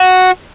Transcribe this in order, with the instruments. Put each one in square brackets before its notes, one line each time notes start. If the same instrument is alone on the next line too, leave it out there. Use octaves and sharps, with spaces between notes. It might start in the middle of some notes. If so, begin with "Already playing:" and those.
Already playing: [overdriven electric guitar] F#4